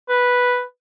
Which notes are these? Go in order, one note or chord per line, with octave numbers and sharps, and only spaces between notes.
B4